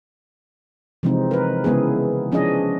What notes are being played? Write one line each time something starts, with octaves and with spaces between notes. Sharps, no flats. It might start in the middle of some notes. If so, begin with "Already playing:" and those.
C3 E3 F3 G#3 C4 D#4
A#4 B4
C#3 G#3 B3 E4 G#4
F3 C#4 D4 G#4 D#5